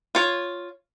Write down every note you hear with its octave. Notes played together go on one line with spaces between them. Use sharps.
F4 C#5